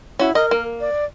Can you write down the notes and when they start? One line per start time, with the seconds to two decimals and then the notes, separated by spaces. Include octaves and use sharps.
0.19 C#4 E4 F#4
0.35 A#4 D#5
0.51 A#3
0.81 D5